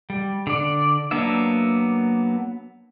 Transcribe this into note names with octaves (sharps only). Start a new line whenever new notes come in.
G3
D3 D5
F#3 A#3 B3 D4 E5